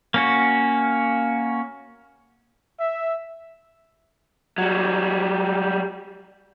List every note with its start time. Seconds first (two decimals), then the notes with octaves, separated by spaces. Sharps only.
0.14 A#3 C#4 F#4
2.81 E5
4.58 F#3 G3